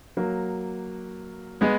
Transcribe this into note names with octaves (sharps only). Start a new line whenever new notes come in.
F#3 A#3
G#3 B3